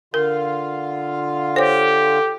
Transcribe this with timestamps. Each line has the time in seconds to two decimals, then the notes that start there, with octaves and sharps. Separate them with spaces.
0.14 D3 F4 A#4 F5
1.56 G4 A4 C5 C#5